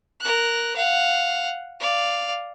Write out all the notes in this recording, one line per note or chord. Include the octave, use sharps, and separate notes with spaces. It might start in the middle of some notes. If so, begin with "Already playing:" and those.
A#4 F#6
F5 F#5
D5 F5